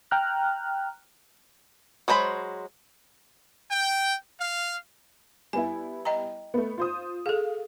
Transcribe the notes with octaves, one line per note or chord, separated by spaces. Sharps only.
G5 A#5 F6 F#6
F#3 G#3 C5 A#5 B5
G5
F5
G3 B3 E4 G#5
D#5 G5 A#5
A3 B3
F4 C5 D#6
G#4 A4 F5